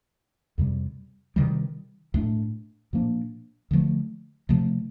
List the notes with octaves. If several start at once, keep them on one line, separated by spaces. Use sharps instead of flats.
F2 C3 G3
C3 D#3 G3
A2 A3 D4
A#2 F3 A#3 D4
D3 F3 A3
C3 F3 A3